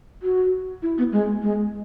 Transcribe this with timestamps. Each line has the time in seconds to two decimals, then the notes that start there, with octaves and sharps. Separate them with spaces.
0.23 F#4
0.82 E4
0.98 B3
1.12 G#3
1.42 G#3